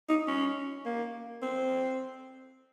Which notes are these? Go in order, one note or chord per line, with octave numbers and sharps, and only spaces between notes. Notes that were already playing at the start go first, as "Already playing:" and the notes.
D#4
C#4
A#3
C4